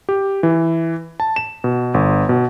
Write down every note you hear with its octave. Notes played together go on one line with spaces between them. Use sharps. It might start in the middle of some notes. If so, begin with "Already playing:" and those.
G4
E3
A5
E7
B2
G1
B2